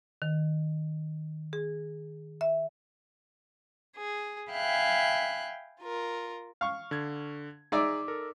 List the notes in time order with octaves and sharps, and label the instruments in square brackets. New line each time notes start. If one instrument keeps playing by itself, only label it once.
[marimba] D#3
G#4
E5
[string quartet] G#4
E5 F5 G5 G#5 B5 F#6
F4 A#4
[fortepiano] F5 C#6
[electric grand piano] D3 G#6
[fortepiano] D#4 D5 E5 [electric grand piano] G#4 A#5 D6
[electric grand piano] A4 A#4